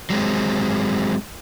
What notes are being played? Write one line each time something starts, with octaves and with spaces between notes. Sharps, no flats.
F#3 G#3 C4